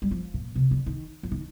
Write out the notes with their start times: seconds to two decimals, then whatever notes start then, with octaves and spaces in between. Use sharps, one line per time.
0.02 G3
0.11 F3
0.34 A#2
0.56 C3
0.71 D3
0.86 D#3
1.23 F3
1.32 D#3